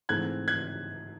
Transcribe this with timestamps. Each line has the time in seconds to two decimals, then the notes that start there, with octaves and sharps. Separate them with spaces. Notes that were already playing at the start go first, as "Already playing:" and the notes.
0.09 G#2 E3 A3 C4 F#6 G#6
0.48 F#6 G#6